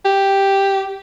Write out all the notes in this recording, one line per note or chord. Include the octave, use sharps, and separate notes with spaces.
G4